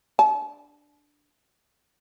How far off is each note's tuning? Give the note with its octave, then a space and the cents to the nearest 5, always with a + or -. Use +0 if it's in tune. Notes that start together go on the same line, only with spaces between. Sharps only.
D4 +0 A5 -45